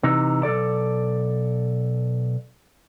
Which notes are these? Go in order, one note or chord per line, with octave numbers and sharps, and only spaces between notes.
C3 E3 D#4
B1 C3 A4 D5